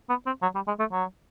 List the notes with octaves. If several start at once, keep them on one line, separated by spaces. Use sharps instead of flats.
B3
C4
F#3
G3
G#3
A3
F#3